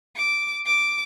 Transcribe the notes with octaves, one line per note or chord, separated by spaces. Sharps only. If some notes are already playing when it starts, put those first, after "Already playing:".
D6
D6